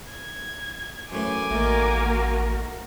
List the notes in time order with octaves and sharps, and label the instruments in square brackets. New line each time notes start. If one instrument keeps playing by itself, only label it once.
[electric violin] G#6
[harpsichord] F#2 A2 E3 [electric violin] G#5 D6
[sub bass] A1 [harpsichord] D#3 A3 [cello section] A#3 F#4 A#4